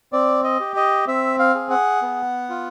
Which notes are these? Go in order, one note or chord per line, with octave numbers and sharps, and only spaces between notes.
C4 D5
D#5
G4
D#5
C4 E5
F5
G#4
F#5
B3
F4